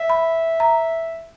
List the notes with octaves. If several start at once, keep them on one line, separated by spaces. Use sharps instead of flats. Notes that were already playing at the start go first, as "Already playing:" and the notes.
Already playing: E5
B5
A#5